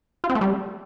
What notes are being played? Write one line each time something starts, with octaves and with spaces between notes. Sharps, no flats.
F4
C4
A3
G3